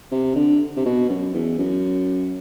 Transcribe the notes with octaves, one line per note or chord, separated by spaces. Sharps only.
C3
D3
C3
B2
F#2
E2
F#2